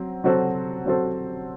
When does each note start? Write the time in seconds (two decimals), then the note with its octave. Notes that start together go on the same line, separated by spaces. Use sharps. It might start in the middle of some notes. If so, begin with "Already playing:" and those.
Already playing: F#3 C4
0.24 F#3 C4 F#4 A4 C5
0.86 F#3 C4 F#4 A4 C5